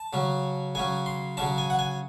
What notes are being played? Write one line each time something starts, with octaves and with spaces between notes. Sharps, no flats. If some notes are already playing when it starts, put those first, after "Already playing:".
Already playing: A5
C#3 F#3 C#4
C#3 F#3 C#4 G#5
C6
C#3 F#3 C#4 A5
G#5
F#5
G#5